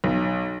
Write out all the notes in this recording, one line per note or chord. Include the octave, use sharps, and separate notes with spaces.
B1